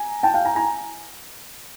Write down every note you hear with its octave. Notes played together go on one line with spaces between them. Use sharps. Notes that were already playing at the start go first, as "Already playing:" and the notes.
Already playing: G#5 A#5
G5 A5
F5 G5
G#5 A#5
G#5 A#5